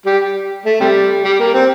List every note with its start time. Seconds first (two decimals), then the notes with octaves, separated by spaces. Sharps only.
0.06 G3 G4
0.65 A3
0.80 C3 G3
1.24 G3
1.39 A#3
1.54 C4